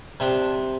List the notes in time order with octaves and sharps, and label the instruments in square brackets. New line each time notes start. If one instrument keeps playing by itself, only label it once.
[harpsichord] C3 D4